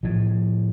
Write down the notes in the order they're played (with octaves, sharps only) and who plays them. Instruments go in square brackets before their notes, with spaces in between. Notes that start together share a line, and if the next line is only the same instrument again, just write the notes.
[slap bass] A2 F3